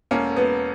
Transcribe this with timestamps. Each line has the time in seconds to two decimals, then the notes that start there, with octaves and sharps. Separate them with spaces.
0.11 E1 A#3 C#4
0.36 E1 B3